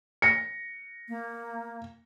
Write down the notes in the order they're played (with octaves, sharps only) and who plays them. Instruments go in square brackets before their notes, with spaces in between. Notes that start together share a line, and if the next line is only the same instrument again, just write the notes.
[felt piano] A#6 C#7
[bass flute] A#3